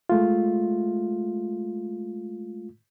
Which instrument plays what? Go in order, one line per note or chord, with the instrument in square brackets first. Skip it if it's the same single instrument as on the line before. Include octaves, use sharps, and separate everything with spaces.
[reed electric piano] G#3 A3 F4